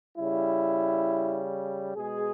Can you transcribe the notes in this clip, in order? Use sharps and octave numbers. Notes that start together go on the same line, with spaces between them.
C#3 G3 E4
B2 G#3 G#4